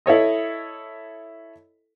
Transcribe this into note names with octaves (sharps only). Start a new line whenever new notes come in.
E4 A4 C#5 D#5